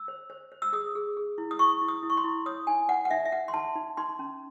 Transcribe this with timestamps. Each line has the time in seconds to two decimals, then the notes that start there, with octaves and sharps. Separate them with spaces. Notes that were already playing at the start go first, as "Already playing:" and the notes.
Already playing: E6
0.08 C5
0.30 C5
0.52 C5
0.62 E6
0.73 G#4 D#6
0.95 G#4
1.17 G#4
1.38 E4
1.51 D#6
1.59 E4 C#6
1.82 E4
1.88 D#6
2.03 E4
2.10 C#6
2.17 C6
2.24 E4
2.46 C#5 D#6
2.67 D#4 G#5
2.89 D#4 F#5
3.05 F#5
3.11 D#4 E5
3.25 E5
3.32 D#4 F#5
3.48 C6
3.54 D#4 A5
3.75 D#4
3.97 D#4 C6
4.19 C#4